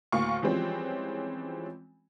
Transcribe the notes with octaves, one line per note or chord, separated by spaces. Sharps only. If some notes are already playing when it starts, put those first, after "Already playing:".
D2 A2 A#3 F5 C#6
E3 F3 G3 G#3 C4 C#4